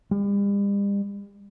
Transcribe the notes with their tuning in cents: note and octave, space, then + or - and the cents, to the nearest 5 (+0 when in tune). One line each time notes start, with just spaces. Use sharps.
G3 +40